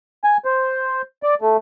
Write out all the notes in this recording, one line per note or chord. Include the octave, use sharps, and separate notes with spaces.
G#5
C5
D5
A3